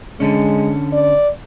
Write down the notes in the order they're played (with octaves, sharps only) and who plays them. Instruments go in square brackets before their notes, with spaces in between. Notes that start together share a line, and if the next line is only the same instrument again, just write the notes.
[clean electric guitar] D3 C#4 [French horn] G#3
[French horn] D5